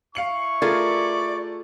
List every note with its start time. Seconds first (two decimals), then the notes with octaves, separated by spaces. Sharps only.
0.15 E4 F5 C#6 C#7 F#7
0.62 A3 F4 G#4 A#4 D5